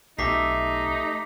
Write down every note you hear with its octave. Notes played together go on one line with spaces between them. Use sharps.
B1 A3 D#4 G4 E5 D6 B6 C7